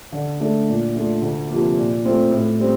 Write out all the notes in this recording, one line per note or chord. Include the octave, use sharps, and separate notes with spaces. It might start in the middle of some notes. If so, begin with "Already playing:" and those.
D3
A3 D4
A#2
A3 D4 F4
D2
C3 F3 A#3
A#2
A3 C4 F4
A2
G3 C4